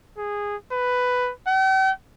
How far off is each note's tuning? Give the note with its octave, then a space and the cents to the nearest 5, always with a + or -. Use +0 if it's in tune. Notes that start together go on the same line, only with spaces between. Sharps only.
G#4 -15
B4 +10
G5 -45